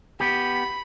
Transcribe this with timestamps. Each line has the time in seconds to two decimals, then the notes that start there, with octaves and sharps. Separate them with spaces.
0.20 B3 G4 B5